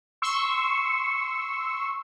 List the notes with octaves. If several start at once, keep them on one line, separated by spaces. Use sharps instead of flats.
C6 C#6 E6